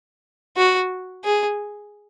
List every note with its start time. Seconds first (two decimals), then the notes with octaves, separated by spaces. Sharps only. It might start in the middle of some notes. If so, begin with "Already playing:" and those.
0.57 F#4
1.24 G#4